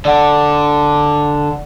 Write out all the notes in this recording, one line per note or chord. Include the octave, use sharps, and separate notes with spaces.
D3 D5 F#5